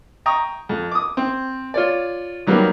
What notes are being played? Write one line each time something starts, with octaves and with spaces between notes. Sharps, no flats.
G5 A#5 C#6 D#6
F2
D6 D#6
C4
F4 C#5 D5
D#3 F#3 G3 A#3 B3